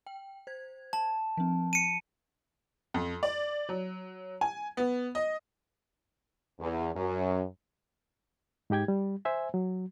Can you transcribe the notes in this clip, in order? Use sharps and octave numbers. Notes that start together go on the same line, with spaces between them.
G5
C5 G#6
A5
F3 C4
C#7 D#7
F2
D5
F#3
G#5
B3
D#5
E2
F#2
G#2 D#4 G4 G5 G#6
G3
C5 E5 G#5
F#3